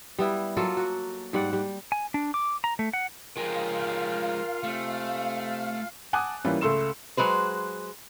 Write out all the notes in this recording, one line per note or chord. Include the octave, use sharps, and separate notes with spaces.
G3 B3 E4
F#3 A#3 F4 A4
F#4
G#2 G3 D5 F#5
G3
G#5
D4
D6
A#5
A3
F#5
F3 G#3 F4 A#4 F5 G5 G#5
C3 A3
F#5 G#5 A5 D6 D#6 F#6
E3 G3 A#3 C#4 F4
C#2 A3 A4 C6 E6 E7
F#3 G#3 B4 C5